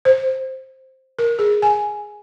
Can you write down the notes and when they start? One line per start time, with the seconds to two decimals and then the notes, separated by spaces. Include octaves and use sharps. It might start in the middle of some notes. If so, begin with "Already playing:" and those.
0.05 C5
1.19 A#4
1.39 G#4
1.62 G#5